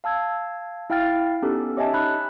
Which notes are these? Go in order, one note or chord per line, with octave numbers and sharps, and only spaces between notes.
F5 A5 E6 G#6
E4 F5 G5 F6 A6
B3 C#4 D#4 G4 A4
G4 C#5 D#5 E5 G#5 A5
D#4 B5 F#6